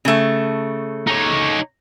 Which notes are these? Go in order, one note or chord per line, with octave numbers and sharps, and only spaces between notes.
C#3 A3
D#4 C#5